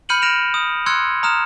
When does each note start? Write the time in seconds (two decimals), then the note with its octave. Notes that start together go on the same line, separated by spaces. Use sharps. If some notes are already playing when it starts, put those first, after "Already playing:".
0.09 B5 F6 G6 C#7 D#7 F#7
0.22 F6 A#6 D7 E7 F7
0.54 D#6
0.86 C6 E6 F#6 G#6 C#7
1.23 A#5 D#6 F6 E7